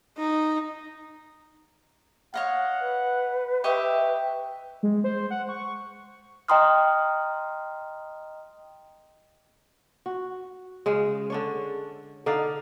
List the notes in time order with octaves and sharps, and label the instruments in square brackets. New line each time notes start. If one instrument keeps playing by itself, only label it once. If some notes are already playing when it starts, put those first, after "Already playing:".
[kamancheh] D#4
[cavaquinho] C#5 D#5 F5 [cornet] F#5
[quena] B4
[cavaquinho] G4 D#5 C#6 [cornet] E5
[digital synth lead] G#3
C5
F#5
C#6
[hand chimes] D#5 G5 A#5 C6 D#6 F6
[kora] F#4
C#3 G#3
D3 D4 C#5
D3 D#4 D5 F5